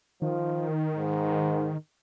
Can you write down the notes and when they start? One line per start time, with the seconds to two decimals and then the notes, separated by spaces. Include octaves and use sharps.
0.22 D#3 F3
0.96 G#2